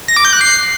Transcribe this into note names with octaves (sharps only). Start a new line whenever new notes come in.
A#6
D6
G6
F#6
C7